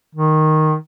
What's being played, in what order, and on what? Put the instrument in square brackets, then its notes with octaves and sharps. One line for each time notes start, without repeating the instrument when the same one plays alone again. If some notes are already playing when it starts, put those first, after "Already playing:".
[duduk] D#3